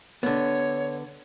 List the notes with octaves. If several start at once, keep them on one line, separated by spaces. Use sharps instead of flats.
D3 B3 C#5